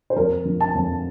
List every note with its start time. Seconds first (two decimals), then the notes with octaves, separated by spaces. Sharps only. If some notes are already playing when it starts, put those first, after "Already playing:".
0.10 C5
0.16 F2 A#4
0.45 F3
0.60 A5
0.75 F2